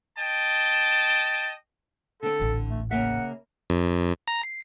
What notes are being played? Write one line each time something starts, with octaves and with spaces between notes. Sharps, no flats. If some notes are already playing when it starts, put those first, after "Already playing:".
D#5 G5 A5
D3 C4 A4
D#1 A1
A3
C#3 A#3 E5 F#5
F2
A#5
C7